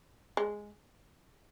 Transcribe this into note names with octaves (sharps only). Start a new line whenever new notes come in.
G#3